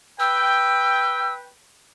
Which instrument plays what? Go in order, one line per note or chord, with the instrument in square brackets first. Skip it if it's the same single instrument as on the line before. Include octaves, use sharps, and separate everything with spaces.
[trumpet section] B4 G5 [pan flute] E6